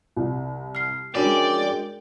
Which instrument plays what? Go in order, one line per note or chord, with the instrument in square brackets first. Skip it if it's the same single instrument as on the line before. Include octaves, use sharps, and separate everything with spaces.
[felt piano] C2
[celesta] F6 C7
[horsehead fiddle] G#3 G5 [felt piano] C#4 [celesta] D4 F#4 A#4 [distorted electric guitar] D5